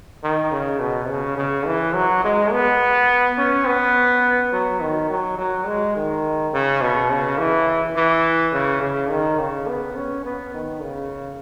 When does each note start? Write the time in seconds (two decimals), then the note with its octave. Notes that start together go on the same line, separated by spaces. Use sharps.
0.23 D#3
0.52 C#3
0.80 B2
1.09 C#3
1.37 C#3
1.66 E3
1.95 F#3
2.24 G#3
2.52 B3
3.38 C#4
3.66 B3
4.53 F#3
4.81 D#3
5.10 F#3
5.38 F#3
5.67 G#3
5.96 D#3
6.53 C#3
6.81 B2
7.10 C#3
7.38 E3
7.96 E3
8.53 C#3
8.81 C#3
9.10 D#3
9.39 C#3
9.68 B3
9.96 C#4
10.25 B3
10.54 D#3
10.82 C#3